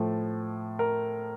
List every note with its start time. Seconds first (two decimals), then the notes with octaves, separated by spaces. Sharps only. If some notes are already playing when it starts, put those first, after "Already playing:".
Already playing: A2 F3 A3
0.79 A#4